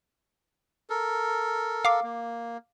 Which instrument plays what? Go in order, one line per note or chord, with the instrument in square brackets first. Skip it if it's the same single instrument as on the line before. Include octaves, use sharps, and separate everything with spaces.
[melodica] A4 A#4
[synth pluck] F5 D6
[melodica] A#3